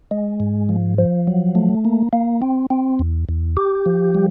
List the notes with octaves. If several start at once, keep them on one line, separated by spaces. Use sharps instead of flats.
G#3
G#2
F3
F3
F#3
A3
A#3
A#3
C4
C4
E2
E2
G4
F3
G3